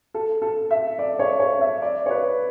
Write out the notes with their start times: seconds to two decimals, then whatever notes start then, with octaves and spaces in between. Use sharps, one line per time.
0.14 A4
0.42 A4
0.71 E5
0.99 D5
1.19 C#5
1.40 C#5
1.61 E5
1.82 D5
2.06 C#5
2.11 B4